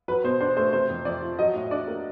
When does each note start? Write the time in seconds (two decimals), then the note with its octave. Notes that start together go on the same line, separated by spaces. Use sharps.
0.08 F#3 B4
0.24 B2 C5
0.41 D4 C5
0.57 A3 C5
0.73 C3 C5
0.89 F2
1.05 F2 D5
1.22 F3
1.39 F#3 D#5
1.54 A2
1.71 D4 D5
1.87 A#3